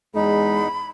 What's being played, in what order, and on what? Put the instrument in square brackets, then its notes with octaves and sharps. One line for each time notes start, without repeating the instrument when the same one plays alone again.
[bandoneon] E2 D#4 [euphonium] G#3 [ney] B5